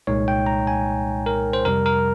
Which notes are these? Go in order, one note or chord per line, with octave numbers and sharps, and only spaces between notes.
C2 A#2 G#3 D#4 C#5
G5
A#5
G#5
A#4
C5
F2 C3 G3 A#4
A#4